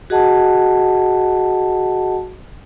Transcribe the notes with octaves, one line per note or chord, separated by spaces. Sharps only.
F#4 G#4 D#5 F#5 A5